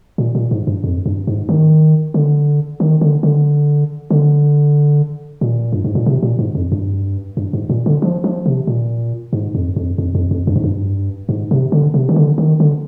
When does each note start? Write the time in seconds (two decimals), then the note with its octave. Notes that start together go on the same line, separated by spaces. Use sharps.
0.18 A#2
0.35 A#2
0.51 G#2
0.67 G2
0.84 F2
1.06 G2
1.27 G#2
1.49 D#3
2.14 D3
2.80 D#3
3.01 D3
3.23 D3
4.10 D3
5.41 A#2
5.72 G2
5.84 G#2
5.95 A#2
6.06 C3
6.23 A#2
6.39 G#2
6.55 F2
6.72 G2
7.37 G2
7.53 G#2
7.70 A#2
7.86 D3
8.02 F3
8.24 F3
8.46 C3
8.67 A#2
9.33 G#2
9.55 F2
9.76 F2
9.98 F2
10.15 F2
10.31 F2
10.47 G2
10.56 G#2
10.64 G2
11.29 G#2
11.51 C3
11.72 D3
11.94 C3
12.09 D#3
12.16 D3
12.38 D#3
12.60 D3